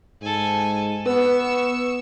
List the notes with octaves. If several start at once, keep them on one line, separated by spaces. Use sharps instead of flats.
G#2 A4 G#5
B3 B4 C#6 E6